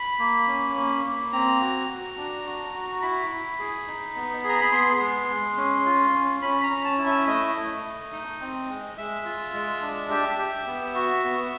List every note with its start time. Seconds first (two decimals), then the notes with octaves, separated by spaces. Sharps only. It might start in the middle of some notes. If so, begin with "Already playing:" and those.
Already playing: B5
0.19 A#3
0.47 C#4
0.76 A#3
1.05 A#3
1.33 C4 A#5
1.61 F#4
1.89 F#4
2.17 D4
2.46 F#4
2.74 F#4
2.92 A#5
3.02 E4 B5
3.30 E4
3.59 G#4
3.87 D#4
4.15 B3
4.44 G#4
4.49 A#5
4.61 B5
4.72 B3 C6
5.00 G#3
5.29 G#3
5.57 C#4
5.86 F4
6.14 C#4
6.42 C#4 B5
6.63 A#5
6.70 C#4
6.84 A5
6.98 E4
7.06 E5
7.27 A3 D#5
7.55 A3
7.84 A3
8.12 D#4
8.40 C4
8.69 G#3
8.97 G#3 E5
9.25 F4
9.54 G#3
9.82 D4
10.10 G4
10.39 G4
10.67 B3
10.95 F#4
11.24 B3